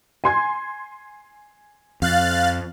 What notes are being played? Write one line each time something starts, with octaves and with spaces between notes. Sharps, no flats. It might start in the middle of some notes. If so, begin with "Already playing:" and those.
G#5 C6 G#6
F2 F5 F#6 A6